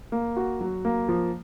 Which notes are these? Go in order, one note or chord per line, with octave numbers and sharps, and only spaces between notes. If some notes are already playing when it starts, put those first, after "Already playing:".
A#3
F#4
F#3
A#3
F3